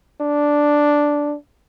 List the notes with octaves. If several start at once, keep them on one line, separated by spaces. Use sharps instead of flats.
D4